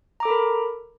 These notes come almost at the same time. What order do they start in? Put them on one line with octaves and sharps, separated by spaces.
A#5 D6 A4 B5 A#4